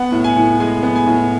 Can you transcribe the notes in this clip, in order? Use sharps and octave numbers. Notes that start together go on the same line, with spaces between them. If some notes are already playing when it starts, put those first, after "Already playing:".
Already playing: B3 F#5
A2
G#5
A2
G#3 G#5
B3
G#5
A2